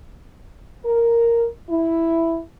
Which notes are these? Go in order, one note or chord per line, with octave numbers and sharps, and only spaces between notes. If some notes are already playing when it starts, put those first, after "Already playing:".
A#4
E4